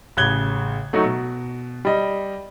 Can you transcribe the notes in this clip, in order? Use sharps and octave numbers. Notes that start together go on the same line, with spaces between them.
A1 C#3 F#6 G#6 G7
F#3 A3 D#4 F#4
B2
G3 D#5